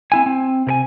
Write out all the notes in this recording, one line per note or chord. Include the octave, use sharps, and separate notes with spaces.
C4 E4 G#5
C4
C3 A#4 G#5